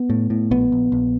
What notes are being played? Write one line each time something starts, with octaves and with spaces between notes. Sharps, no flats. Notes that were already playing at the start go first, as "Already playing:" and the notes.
Already playing: B3
A2
A2
A#1 B3
A#1
A#1